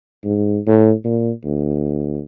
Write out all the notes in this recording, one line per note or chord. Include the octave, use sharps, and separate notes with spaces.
G#2
A2
A#2
D2